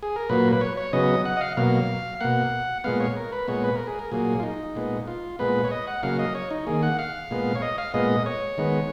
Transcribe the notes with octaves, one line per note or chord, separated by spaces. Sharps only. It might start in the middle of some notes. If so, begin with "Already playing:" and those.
G#4
A#4
A#2 F#3 A#3 B4
B4
C#5
C#5
C#3 F#3 B3 D#5
F#5
D#5
F5
B2 F#3 A#3 F5
B2 A#3 F#5
A#2 G#3 B3 F5
C#5
A#4
B4
A#2 G#3 B3 C#5
B4
A#4
G#4
A#4
A#2 F#3 A#3 G#4
F4
D#4
A#2 G#3 B3
F4
A#2 G#3 B3 B4
C#5
D#5
F#5
C#3 F#3 A#3 F5
D#5
C#5
D#4
D#3 A#3 G#4
F#5
F5
A#2 G#3 B3
C#5
D#5
F5
A#2 G#3 B3 D#5
C#5
D#3 G#3 B3